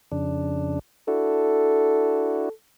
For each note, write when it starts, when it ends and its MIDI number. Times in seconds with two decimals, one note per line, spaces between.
0.12 0.79 41
0.12 0.79 49
0.12 0.79 62
1.08 2.49 62
1.08 2.49 64
1.08 2.49 66
1.08 2.50 69